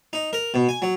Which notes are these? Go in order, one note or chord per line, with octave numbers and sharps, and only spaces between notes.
D#4
A#4
B2
G#5
F#3